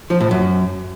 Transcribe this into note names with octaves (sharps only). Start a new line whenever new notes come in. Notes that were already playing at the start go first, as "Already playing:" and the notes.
F3
A2
F#2